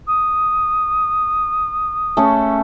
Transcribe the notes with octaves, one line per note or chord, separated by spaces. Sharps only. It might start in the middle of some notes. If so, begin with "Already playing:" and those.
D#6
A3 C#4 A4